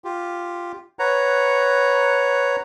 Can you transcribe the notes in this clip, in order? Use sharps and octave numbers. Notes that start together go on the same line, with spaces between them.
F4 G4
B4 C#5 F#5 A#5